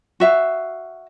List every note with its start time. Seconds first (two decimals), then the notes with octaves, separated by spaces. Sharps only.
0.20 F#4 E5 F5